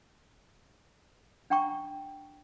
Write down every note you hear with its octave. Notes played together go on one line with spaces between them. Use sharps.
D4 F#5 G5 A#5 C#6